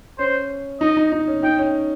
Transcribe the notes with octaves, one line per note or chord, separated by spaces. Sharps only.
C#4 C5
D#4 D#5
D#4
D#4
C#4
D#4 G5
C#4